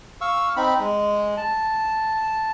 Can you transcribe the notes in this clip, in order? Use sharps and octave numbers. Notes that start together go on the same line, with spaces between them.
F5 C#6 E6
C4 D#4 B5
G#3
A5